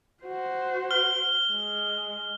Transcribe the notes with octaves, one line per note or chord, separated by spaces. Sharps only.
F#4 C5
F6 G7
G#3